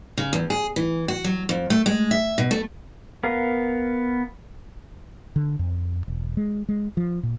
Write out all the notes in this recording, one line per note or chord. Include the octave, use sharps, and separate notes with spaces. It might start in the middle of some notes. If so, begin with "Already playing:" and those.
C#3
E2
G#4
E3
F#4
F#3
F2
A3
G#3
E5
B2
A3
B3 A#4 F5
D3
F2
E1
G#3
G#3
F3
A#2